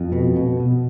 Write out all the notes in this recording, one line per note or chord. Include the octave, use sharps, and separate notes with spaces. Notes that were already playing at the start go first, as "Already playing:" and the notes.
Already playing: F2
B2
B2
B2